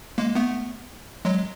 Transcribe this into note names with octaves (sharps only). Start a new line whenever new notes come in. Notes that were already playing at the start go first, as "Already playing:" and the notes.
G#3 A#3
A3 B3
F#3 G#3